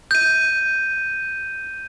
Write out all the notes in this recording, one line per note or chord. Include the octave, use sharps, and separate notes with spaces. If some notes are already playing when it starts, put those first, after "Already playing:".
G6 D#7